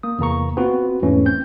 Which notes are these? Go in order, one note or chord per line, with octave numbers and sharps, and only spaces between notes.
A#3 D#6
E2 C3 A#3 A#5 C#6
B3 C4 F4 F#4
E2 G#2 E3 A3 C#4
C4 G6